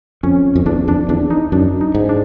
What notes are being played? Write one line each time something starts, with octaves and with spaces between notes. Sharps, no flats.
F2 C#4
F2
E2 D4
F2 D4
E2 D4
D#4
F#2 D4
D#4
G#2
D4